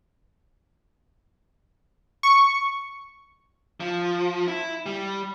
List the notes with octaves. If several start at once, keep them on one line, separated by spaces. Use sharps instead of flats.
C#6
F3
E4
G3